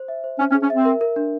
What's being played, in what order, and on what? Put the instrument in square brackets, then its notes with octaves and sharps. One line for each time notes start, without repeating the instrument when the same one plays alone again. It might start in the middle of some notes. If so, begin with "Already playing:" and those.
Already playing: [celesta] C5
E5
C5
[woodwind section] C#4 [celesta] C5
[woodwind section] C#4
[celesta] G#4
[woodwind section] C#4
[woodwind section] C4 [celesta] E5
[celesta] A#4
A#4
D4